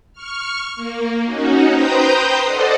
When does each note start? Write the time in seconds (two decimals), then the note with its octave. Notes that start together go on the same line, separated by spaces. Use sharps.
0.13 C#6 F6
0.75 A#3
1.24 C#4 D#4 F#4
1.70 B4 C5 G5 A#5 D#6 G6
2.44 A4 C5 D5 D#5 F#5